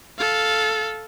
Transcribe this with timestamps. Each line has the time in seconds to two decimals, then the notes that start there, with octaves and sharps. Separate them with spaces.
0.18 A4 F5